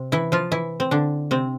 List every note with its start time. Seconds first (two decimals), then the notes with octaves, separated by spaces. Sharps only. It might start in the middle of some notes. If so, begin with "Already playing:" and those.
Already playing: C3 C4
0.12 E3 E4
0.32 F3 F4
0.52 E3 E4
0.80 C4
0.91 D3 D4
1.31 C3 C4